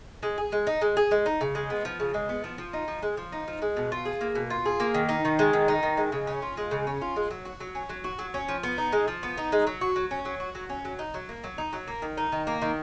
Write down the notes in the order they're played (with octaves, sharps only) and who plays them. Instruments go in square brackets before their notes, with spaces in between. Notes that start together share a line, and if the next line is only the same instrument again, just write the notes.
[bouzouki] G#3
G#4
G#3
D#4
G#3
G#4
G#3
D#4
C#3
G#3
B3
F3
C#3
G#3
B3
F3
F3
D#4
F3
G#3
F3
D#4
F3
G#3
B2
F4
G#4
A#3
B2
F4
G#4
A#3
D#3
D#4
D#3
G#3
D#3
D#4
D#3
G#3
C#3
C#4
F4
G#3
C#3
C#4
F4
G#3
F#3
F#4
F#3
C#4
F#3
F#4
F#3
C#4
F3
B3
D#4
G#3
F3
B3
D#4
G#3
F#3
F#4
F#3
C#4
F#3
F#4
F#3
C#4
F#3
D#4
F#3
A#3
F#3
D#4
F#3
A#3
D#3
D#4
D#3
A#3
D#3